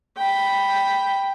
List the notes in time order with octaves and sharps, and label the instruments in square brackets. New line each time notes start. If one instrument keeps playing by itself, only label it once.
[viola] G5 B5